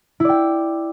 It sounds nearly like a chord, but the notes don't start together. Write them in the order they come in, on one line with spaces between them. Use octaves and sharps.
E4 D5 G5